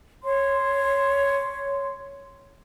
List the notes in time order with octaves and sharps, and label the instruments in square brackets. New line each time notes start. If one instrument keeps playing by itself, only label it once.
[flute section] C#5 C6